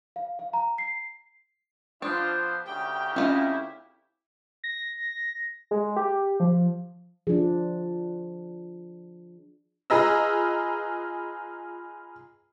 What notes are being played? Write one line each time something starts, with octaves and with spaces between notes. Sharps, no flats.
F5
F5
A#5
C7
F3 B3 D4 F4 C5
D2 C#3 G4 G5
A3 C4 C#4 E4 F4 D#5
A#6
G#3
G4
F3
F3 D4 G#4
F4 G#4 B4 D#5 A#5 E6